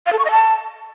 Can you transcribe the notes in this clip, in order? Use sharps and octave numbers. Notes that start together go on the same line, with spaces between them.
F5
A4
C#6
D#5
A5